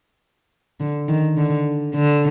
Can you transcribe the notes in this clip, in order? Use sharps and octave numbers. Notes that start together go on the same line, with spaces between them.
D3
D#3
D3
D3